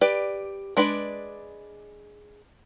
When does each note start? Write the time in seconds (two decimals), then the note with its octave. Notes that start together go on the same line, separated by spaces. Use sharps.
0.01 G4 B4 D5
0.77 G#3 D4 B4 D5 B5